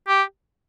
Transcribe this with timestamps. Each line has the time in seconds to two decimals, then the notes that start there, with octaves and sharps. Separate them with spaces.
0.08 G4